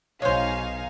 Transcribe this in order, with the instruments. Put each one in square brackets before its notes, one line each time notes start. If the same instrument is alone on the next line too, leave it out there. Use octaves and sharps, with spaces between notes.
[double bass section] B1 [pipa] G#3 C5 [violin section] D#4 F5 G#5 [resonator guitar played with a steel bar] C#5